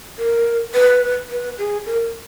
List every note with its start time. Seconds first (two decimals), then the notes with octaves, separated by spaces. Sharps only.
0.18 A#4
0.74 B4
1.30 B4
1.58 G#4
1.86 A#4